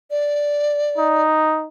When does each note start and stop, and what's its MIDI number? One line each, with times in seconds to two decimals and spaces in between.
0.11 1.23 74
0.98 1.67 63